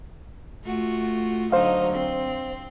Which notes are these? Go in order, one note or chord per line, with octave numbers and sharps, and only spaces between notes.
A3 F4 F#4
D3 F#3 D#4 C5 F5
C4